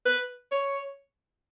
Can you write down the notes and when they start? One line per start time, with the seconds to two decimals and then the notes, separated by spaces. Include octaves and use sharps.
0.06 B4
0.52 C#5